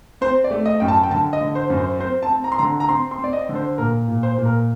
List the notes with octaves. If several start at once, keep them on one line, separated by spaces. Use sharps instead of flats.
C4 C5
D5
A3
D#5
F#2 G5
A5
G5
D3 A5
D#5
D3
C5
F#2
C5
C4 C5
A5
C4
A#5
C6
D3 A#5
A#5
C4 C6
C6
C4
D5
D#5
D3
C5
A#2 A#4
A#2
C5
A#2
A#4